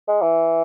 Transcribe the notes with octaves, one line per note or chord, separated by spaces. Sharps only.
G#3
E3